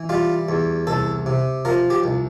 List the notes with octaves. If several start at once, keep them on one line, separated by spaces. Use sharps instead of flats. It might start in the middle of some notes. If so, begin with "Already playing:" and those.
Already playing: E3
G3 F4
E2
C2 A4
C3
F3 A#4
G4
C2